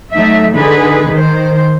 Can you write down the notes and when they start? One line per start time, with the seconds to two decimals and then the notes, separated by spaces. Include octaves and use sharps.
0.12 F#3 A3 D#4 E5
0.54 D3 D#4 G#4 B4
1.11 D#3 C5